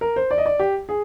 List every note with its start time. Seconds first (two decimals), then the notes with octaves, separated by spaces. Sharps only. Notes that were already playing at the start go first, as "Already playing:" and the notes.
0.01 A#4
0.16 C5
0.31 D5
0.38 D#5
0.46 D5
0.59 G4
0.89 G#4